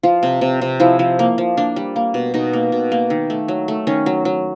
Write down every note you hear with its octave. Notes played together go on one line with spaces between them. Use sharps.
F3 F4
C3
C3
C3
F3 E4
F3
A#3
F3
A#3 D4
G3
A#3
B2
B2 D#4
A#3
B2
A#3
D#3
A3
F#3
A3
D#3 C#4
F#3
F#3